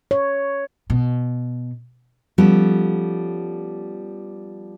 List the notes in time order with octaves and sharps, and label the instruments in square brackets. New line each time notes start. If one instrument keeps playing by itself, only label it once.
[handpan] C#5
[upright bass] B2
[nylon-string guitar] F3 G3 B3 C#4 A4